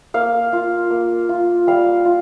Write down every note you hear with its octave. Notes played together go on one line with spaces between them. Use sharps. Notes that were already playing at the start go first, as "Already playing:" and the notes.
A#3 F5
F4
A#3
F4
G3 F5
F4